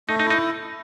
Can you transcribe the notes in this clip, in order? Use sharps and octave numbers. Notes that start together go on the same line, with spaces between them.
A3 D#4
D#4
E4
D#4